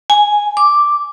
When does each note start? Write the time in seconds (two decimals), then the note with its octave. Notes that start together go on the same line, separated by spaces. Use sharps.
0.10 G#5
0.57 D6